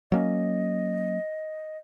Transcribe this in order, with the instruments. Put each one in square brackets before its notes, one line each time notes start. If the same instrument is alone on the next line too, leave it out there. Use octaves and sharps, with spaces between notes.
[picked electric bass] F#3 A#3 C#4 [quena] D#5